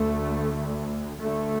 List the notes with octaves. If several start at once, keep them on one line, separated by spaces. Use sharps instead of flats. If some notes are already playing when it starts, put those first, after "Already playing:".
Already playing: D2 A3
D2 A3